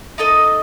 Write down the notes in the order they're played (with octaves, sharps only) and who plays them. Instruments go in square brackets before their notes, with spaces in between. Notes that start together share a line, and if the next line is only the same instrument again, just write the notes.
[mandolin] D#4 A4 D#5